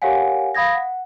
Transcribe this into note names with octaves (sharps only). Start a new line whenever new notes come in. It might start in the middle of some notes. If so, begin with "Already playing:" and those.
G4 A#4 C#5 F5 F#5 G#5
F5 B5 D#6 G#6 A#6
F#5